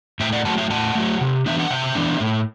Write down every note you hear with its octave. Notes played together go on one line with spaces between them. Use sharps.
A2 E5 G5
D5 F#5
F#3 A3 F#5 A5
E5 G5
A2 F#5 A5
F#3 A3
C3
E3 B3 D4 E5
F#5
C3 E5 G5
E3 B3 D4
A2